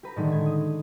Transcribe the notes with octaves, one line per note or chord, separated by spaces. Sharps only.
G4 B4 A#5
A2 D3 D#3 G#3 A3
G#6
D#6